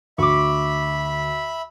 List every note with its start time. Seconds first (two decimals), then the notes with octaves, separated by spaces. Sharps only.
0.18 D2 E5 B5 C#6 D6